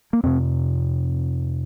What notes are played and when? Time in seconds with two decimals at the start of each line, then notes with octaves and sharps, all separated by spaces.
0.13 A#3
0.23 F2 C3 C4